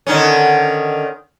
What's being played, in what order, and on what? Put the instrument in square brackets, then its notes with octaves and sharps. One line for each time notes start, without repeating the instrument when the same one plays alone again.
[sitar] D3 D#3 C#4